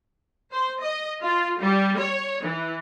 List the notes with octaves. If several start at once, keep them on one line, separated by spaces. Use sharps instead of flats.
C5
D#5
F4
G3
C#5
E3